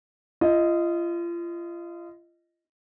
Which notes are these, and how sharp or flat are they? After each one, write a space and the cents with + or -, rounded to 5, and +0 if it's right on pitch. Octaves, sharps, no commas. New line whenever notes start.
F4 -35 D#5 +0